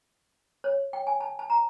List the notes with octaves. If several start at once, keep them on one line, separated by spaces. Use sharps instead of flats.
C#5
G5
G#5
A5
A5
A#5